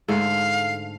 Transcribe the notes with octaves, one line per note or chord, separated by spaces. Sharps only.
G#2 D3 A3 F5